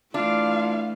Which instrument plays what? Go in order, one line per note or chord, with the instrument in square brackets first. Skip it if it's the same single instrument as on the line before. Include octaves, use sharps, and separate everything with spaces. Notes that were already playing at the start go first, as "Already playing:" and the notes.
[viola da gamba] E3 A3 [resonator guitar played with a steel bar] D4 [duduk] F4 [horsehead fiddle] F5